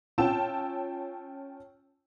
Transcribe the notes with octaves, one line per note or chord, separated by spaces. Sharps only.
C#4 F4 G5 A5 E6 E7